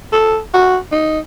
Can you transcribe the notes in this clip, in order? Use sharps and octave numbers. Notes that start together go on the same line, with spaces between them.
A4
F#4
D#4